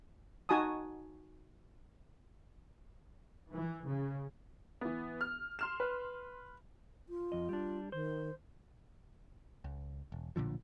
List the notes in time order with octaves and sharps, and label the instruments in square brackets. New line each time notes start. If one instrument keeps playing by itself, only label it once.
[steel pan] D#4 F#4 G#5 A5 D#6
[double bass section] E3
C#3
[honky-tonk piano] E3 B3
F6
C6 F6 E7
[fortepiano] B4
[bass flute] F4
[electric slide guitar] F2 D#5
G3 D4
[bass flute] D#3 [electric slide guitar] C5
[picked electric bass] C#2
E1
B1 A#2 D3 F3